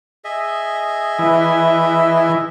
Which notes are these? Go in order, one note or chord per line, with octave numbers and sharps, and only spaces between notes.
G#4 D#5 E5
E3